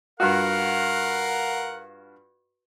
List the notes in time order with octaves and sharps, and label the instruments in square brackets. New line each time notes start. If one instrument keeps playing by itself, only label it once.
[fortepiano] G2 F4 F#4 [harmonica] A#4 F5 F#5